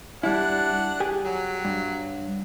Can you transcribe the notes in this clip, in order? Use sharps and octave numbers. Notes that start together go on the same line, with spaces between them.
G3 D4 E4 F#5
G4 G#4
F#3
G2